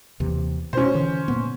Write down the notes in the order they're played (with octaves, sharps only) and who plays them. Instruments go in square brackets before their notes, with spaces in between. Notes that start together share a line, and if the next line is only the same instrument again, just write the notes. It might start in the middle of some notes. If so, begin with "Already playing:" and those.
[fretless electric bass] D#2 C3 E3
[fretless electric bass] B2 [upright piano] C#4 C5
[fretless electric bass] D3 E3
A#2 A#3 B3